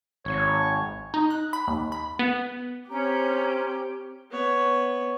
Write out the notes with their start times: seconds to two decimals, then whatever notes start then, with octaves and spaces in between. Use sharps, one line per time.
0.25 G#1 C#5
1.14 D#4
1.30 F#6
1.53 B5
1.68 D#2
1.92 B5
2.19 B3
2.90 C4 C#4 G4 A#5
4.30 B3 C#5